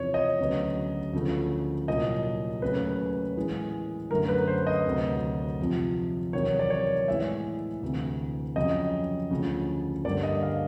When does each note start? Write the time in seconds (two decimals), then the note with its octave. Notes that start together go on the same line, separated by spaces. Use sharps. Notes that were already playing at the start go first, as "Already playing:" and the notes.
Already playing: E2 C3 F3 C#5
0.14 D#5
0.39 D2 C#3 F#3 B3
1.13 D2 C#3 F3 A3
1.87 C2 A#2 F#3 D#5
2.62 D#2 C#3 F#3 A3 B4
3.37 A2 E3 G#3 B3
4.10 F#2 D3 F#3 A3 A#4
4.29 B4
4.47 C5
4.67 D#5
4.85 D2 C3 D#3 F#3
5.59 F2 C3 F3
6.33 E2 C3 D#3 F#3 C#5
6.59 D5
6.70 C#5
7.08 A2 E3 G#3 B3 E5
7.83 D2 C3 E3
8.56 F2 C#3 F#3 D#5
9.31 D2 C#3 F3
10.04 G2 D3 G3 A#3 D5
10.23 D#5
10.43 F5